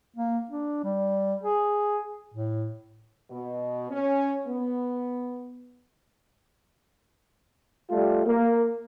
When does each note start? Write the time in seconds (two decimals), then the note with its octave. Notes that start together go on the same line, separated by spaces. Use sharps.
0.17 A#3
0.51 D4
0.84 G3
1.43 G#4
2.34 A2
3.30 B2
3.91 C#4
4.47 B3
7.90 G3 A3 F4
8.26 A#3